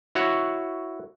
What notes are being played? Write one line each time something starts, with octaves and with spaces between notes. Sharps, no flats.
E4 F#4 C#5